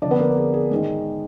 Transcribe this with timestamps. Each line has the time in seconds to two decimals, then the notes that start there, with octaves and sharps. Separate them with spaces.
0.02 F2 D3 D4 D5
0.11 B3 B4
0.19 A#3 A#4
0.37 G#4
0.54 G#4
0.71 G#2 D#3 G#4